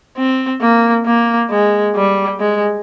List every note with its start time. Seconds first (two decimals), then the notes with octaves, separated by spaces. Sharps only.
0.18 C4
0.61 A#3
1.06 A#3
1.51 G#3
1.96 G3
2.40 G#3